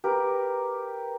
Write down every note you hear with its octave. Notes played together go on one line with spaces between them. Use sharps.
G4 A#4 B4